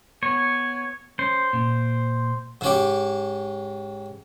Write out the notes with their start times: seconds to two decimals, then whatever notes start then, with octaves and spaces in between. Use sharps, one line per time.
0.23 B3 C#5
1.19 C#4 C5
1.53 A#2
2.61 G#2 C#4 G4